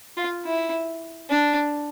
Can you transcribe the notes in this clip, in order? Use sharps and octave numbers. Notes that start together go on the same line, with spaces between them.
F4
E4
D4